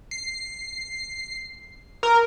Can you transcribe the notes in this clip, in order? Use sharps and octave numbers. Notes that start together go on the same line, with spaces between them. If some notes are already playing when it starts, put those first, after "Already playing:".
C7
A#4